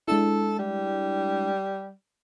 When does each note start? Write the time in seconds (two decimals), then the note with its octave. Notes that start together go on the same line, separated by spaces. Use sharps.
0.08 G#3 D4 E4 A4
0.59 G3